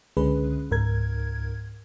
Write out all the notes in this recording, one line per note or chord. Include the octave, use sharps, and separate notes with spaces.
C#2 D3 G#3 C#4 G#4 B4
C#2 G#2 A#4 G#6